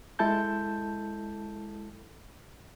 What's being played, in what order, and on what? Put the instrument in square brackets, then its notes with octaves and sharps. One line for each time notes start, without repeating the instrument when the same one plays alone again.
[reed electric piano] G#3 E4 A4 A5 G6